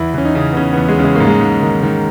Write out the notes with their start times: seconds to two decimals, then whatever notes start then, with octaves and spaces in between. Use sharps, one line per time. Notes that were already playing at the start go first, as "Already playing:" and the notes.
Already playing: E2 E4
0.14 E2 C#4
0.25 D#4
0.35 C#3
0.52 B3
0.56 C#3 C#4
0.73 E2 B3
0.88 G#3
0.99 C#3
1.04 G#3
1.15 G#2 A#3
1.27 G#3
1.41 G#2
1.62 D#3
1.83 D#3